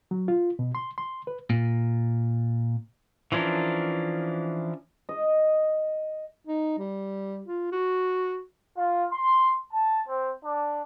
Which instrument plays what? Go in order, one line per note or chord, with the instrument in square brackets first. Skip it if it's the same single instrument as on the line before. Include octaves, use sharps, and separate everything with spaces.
[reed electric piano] F#3
F4
B2
C6
C6
B4
[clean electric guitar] A#2
[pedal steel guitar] E3 F3 C#4 D4 A#4
[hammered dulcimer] D#5
[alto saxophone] D#4
G3
F4
F#4
[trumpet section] F4
C6
A5
C4
D4